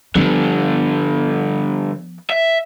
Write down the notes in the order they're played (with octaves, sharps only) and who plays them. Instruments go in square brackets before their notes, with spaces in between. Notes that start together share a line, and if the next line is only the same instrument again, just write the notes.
[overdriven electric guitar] G2 D3 [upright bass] F3 B3
[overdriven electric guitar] E5